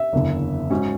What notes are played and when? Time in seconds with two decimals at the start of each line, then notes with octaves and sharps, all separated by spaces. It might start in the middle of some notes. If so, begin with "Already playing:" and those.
Already playing: E5
0.13 F#1 E2 D3
0.70 G#2 F#3 C#4